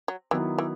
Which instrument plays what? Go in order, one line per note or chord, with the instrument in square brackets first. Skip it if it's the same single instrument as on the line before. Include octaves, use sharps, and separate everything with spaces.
[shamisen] F#3
[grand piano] D#3 F#3 B3 E4 [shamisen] E3
[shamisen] E3